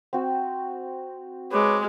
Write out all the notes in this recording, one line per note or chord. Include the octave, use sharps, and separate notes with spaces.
C4 F#4
G#3 B4 C#5 D6